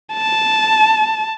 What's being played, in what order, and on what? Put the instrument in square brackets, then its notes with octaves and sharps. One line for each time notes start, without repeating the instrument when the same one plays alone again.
[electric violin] A5